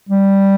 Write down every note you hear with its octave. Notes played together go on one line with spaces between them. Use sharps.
G3